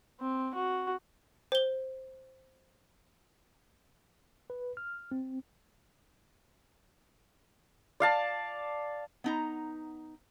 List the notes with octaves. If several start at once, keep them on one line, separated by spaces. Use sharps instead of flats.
C4
F#4
C5 G7
B4
F6
C4
D5 F5 A5
B3 D#4 A#5